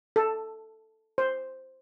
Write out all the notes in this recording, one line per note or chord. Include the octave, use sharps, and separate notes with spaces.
A4
C5